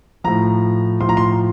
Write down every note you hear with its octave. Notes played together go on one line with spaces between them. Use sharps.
A2 F3 A#5
A2 F3 C6
A#5
C6